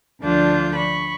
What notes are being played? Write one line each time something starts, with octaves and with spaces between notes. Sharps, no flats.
D2 D3 F3 D4 F4 G6
B5 C#6